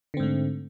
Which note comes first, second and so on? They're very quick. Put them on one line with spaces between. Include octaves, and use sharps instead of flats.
D3 C4 G#2 A3